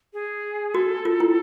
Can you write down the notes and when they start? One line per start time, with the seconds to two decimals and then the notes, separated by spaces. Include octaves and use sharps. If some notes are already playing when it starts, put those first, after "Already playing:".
0.13 G#4
0.74 F#4 A4
1.05 F4
1.20 E4